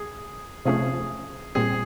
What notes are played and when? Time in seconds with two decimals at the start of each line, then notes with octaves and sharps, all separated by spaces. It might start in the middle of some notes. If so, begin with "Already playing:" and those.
Already playing: G#4
0.65 C3 F3 A3 C#4 G#4
1.55 A#2 G3 C4 G#4